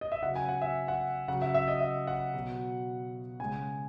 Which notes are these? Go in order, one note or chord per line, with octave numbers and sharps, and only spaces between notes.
D#5
E5
C#3 F#3 F#5
G#5
F#5
E5
F#5
C#3 F#3 F#5
E5
E5
D#5
E5
F#5
B2 F#3
C#3 G#3 G#5